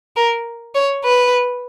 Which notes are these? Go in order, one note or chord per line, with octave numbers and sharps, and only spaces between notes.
A#4
C#5
B4